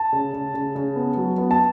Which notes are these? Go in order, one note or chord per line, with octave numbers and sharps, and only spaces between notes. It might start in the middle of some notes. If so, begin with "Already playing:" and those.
Already playing: A5
C#3
C#3
C#3
C#3
B3
F#3
B3
A5